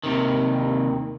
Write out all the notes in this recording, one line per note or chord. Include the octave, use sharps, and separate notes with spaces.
D#2 C3 D#3